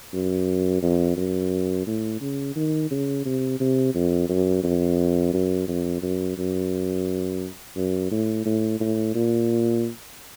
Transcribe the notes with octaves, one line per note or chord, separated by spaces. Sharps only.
F#2
F2
F#2
A2
C#3
D#3
C#3
C3
C3
F2
F#2
F2
F#2
F2
F#2
F#2
F#2
A2
A2
A2
A#2